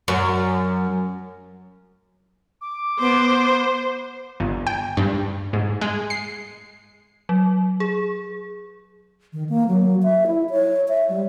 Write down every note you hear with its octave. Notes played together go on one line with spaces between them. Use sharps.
F#2
D6
B3 C5
G1
G5
G2
G#2
G#3
C7
F#3
G#4
D#3
A#3
F#3
E5
E4
C#5
E5
G3